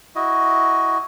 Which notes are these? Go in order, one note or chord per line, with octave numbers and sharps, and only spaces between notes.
E4 F#4 D#5